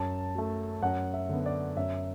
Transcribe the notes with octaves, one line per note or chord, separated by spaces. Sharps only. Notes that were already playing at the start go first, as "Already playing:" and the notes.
Already playing: F#2 A5
F#3 A3
F#2 F#5
E5
D3 B3
D5
F#2 E5